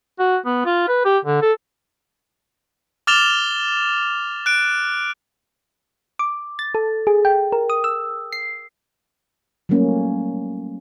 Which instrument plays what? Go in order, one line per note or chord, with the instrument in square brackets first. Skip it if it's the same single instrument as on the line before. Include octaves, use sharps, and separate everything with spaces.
[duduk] F#4
B3
F4
B4
G4
D3
A4
[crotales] D6 F6 A6 E7 F7 G7
F#6 D7
[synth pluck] D6
A6
A4
G#4
G5
A#4
D#6
E6
C7
[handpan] F#3 G3 A3 A#3 C#4